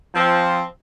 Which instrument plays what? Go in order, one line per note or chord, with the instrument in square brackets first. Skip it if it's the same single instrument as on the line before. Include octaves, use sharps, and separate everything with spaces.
[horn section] F3 C4